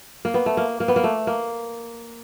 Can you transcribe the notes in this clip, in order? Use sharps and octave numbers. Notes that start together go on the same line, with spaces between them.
A#3
B3
A3
A#3
A#3
B3
A#3
A3
A#3